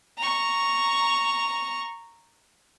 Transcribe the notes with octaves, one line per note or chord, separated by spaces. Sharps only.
A#5 C#6